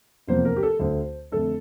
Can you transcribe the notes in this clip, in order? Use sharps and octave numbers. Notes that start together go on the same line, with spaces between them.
F1 E2 C3 F3 A#3 C5
A#4
G4
A4
D2 D3 A3 C5
F2 D3 A3 A4